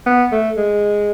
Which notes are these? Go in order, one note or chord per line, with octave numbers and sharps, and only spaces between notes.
B3
A3
G#3